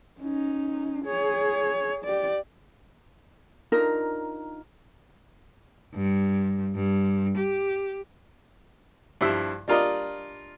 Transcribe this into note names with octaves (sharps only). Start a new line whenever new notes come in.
C#4 D#4
G#4 C#5
G4 D5
D4 D#4 F4 A#4
G2
G2
G4
G2 F3 E4 E5
G3 D4 F4 A#4 D5 D#5